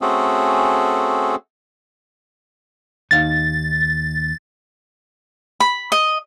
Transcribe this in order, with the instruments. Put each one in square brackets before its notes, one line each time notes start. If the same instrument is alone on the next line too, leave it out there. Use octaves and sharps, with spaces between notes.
[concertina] A3 C4 C#4 F#4 G#4 A4
[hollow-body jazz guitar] D#2 D#4 F5 [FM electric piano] A6
[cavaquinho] B5
D#5